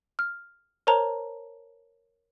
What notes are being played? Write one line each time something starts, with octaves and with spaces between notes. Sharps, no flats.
F6
A#4 C5 C#5 A5 A#5 F7